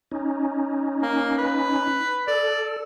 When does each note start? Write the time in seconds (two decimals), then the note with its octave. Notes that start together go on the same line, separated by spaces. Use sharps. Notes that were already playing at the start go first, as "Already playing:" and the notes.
0.12 C#4 D#4
1.02 A#3
1.38 B4
2.27 A4 D5